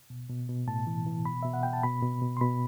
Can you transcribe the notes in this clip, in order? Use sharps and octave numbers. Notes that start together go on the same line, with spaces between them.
B2
B2
B2
A2 A5
E3
E3
B2 B5
B2 E5
F#5
B2 G5
A5
B2 B5
B2
B2
C6
B2 B5